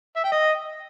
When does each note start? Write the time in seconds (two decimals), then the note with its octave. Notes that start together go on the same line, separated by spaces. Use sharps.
0.16 E5
0.24 G5
0.32 D#5